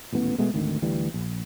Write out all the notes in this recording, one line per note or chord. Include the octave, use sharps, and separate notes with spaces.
D#1 A1 E3 B3
B2 G#3 A3 B3
G#1 D2 D#3
D2 E3 G3
A#1